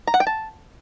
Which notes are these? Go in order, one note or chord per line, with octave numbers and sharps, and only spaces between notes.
A#5
F#5
G5
A5